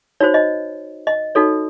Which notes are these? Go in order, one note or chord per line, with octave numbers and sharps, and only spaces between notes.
D#4 F#4 C5 C#5
D#5
D#5
D#4 F#4 A4 C#5